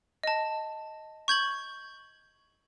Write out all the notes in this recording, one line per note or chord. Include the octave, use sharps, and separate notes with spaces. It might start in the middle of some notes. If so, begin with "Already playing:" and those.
D#5 A5
C#6 G6 G#6 F#7